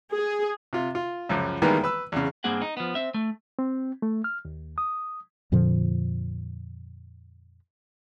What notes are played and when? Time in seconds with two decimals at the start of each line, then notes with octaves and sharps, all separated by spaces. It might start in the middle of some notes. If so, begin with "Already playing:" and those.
0.13 G#4
0.73 C3 F4
0.95 F4
1.29 C#2 F#2 F3
1.62 D#3 E3 G3 G#3 A#3 B3
1.84 B4 E6
2.12 E2 C#3
2.44 G2 A#3 C4 G#4 F#5
2.62 D#4
2.77 F3 B3
2.95 C4 E5
3.14 A3
3.59 C4
4.02 A3
4.24 F6
4.45 D#2
4.78 D#6
5.52 F2 A#2 D3 F3